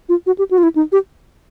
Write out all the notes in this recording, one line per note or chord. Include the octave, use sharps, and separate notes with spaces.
F4
F#4
G4
F#4
F4
E4
D#4
G4